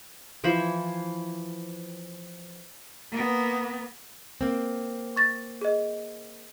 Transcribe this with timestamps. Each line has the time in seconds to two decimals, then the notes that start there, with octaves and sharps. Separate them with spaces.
0.44 E3 F3 C5 B5
3.12 A#3 B3
4.41 A#3 C4
5.16 C#6 A6 A#6
5.62 G#4 D#5